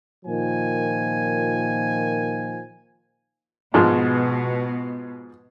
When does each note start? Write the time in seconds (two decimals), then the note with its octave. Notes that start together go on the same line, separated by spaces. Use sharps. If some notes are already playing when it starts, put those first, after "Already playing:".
0.25 A#2 D#3 F3 G#5
3.74 G#2 B2 F3 G#3